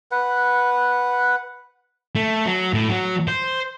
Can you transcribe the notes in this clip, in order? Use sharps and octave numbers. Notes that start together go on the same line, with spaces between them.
B4 F#5
A3
F#3
A2
F#3
C5